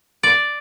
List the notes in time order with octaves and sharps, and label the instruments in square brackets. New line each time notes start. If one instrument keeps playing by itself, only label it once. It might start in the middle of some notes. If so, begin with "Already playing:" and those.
[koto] D5